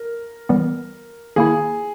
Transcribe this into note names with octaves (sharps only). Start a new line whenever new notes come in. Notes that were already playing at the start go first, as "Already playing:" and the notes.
Already playing: A#4
E3 G3 B3
D#3 A#3 E4 G#4